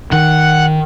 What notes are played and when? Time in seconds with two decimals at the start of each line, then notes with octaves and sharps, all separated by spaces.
0.12 D#3 F#5